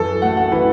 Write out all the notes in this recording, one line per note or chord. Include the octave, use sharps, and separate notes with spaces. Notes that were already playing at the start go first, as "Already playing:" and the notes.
Already playing: F#2 E3 A4
A3 F#5
F#5
E3 B4